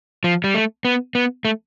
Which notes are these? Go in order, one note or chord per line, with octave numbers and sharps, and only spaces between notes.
F3
G3
A3
B3
B3
A3